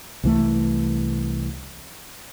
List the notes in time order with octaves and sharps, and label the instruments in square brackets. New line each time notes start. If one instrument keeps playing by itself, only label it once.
[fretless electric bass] C2 E3 A3